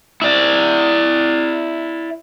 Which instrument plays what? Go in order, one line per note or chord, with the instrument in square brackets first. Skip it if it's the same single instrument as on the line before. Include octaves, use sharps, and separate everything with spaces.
[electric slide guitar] E4 D5